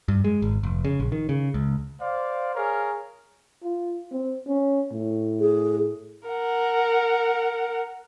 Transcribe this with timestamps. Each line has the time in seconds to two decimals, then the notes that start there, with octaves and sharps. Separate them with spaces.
0.08 G2
0.24 G#3
0.42 G#1
0.63 F1
0.85 C#3
1.00 A#1
1.12 D#3
1.29 C#3
1.54 C#2
1.99 C5 D5 F5
2.54 G#4 A#4 C#5 F5
3.63 F4
4.12 C4
4.47 C#4
4.92 A2
5.40 G#4
6.29 A#4 F#5